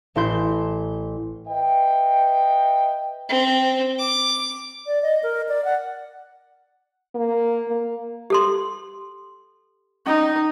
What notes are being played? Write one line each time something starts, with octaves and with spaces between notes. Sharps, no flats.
A1 E4 C6 G6
B4 D#5 E5 G5
C4
D6
D5
D#5
A#4
D5
F#5
A#3
A#3
G4 A4 C6
C#4 D#4